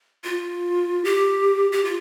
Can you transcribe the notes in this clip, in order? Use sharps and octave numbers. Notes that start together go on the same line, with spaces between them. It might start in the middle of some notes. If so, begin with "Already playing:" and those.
F4
G4
G4
F4